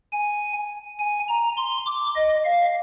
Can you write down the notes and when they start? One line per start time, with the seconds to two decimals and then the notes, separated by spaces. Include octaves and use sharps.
0.13 G#5
1.00 G#5
1.29 A#5
1.57 C6
1.86 D6
2.16 D#5
2.45 F5